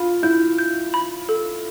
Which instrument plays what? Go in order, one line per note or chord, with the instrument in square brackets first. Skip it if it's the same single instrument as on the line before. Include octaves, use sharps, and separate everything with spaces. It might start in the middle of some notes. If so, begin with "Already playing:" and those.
Already playing: [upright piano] F4 [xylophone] B5
[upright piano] E4 [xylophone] G6
[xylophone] G6
B5
A4